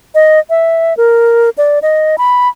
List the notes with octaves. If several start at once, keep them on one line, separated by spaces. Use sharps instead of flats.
D#5
E5
A#4
D5
D#5
B5